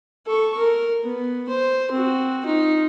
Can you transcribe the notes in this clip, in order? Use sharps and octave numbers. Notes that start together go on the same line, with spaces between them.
A4 C#6
A#4
B3
C5
C4 F#4
D#4 F4